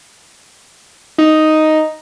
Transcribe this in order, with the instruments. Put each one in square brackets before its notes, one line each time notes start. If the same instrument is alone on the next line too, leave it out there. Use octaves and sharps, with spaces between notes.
[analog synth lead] D#4